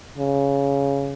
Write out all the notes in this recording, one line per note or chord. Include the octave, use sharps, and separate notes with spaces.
C#3